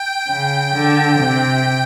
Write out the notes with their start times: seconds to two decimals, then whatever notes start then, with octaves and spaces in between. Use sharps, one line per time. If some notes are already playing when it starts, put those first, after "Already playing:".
Already playing: G5
0.28 C#3
0.74 D3
1.19 C3